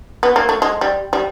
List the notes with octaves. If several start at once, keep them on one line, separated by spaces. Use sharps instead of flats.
B3
A#3
A3
G#3
G3
G3